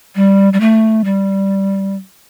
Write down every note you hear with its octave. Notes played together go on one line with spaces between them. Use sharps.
G3
G3
A3
G3